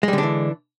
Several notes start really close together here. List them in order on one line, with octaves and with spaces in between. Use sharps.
G#3 G3 D3 D4 E3